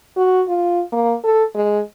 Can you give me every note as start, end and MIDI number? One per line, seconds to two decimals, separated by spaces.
0.16 0.43 66
0.49 0.82 65
0.92 1.15 58
1.24 1.44 69
1.55 1.80 56